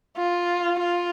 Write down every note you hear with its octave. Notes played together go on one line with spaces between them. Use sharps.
F4
F4